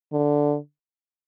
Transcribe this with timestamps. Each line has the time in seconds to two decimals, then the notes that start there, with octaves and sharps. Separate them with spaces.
0.13 D3